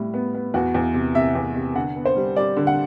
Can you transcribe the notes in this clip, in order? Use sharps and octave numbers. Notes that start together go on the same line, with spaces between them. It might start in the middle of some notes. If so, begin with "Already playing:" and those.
Already playing: A2 G3
B3
B3
E2 F#4
E2
C3
C3 E5
E2
C3
D3 F#5
B3
C5
G3
G3 D5
D3
F#5